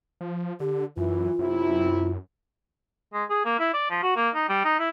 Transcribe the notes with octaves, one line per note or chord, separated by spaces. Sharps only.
F3
D3 G4
F#2 E3 F4
F#2 C3 E4
G#3
G#4
A#3
E4
D5
F3
F#4
A#3
D#4
G3
D#4
E4